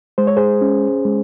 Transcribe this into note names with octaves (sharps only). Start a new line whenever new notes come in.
G#3 C5
C#5
G#4 C5
C#4
G#3